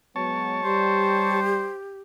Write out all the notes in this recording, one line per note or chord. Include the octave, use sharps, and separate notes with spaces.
F#3 G#3 B3 C#5 A5
G3 G4 C5